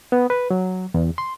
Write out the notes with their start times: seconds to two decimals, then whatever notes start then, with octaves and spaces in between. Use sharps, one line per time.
0.12 B3
0.30 B4
0.51 F#3
0.94 E2
1.18 C6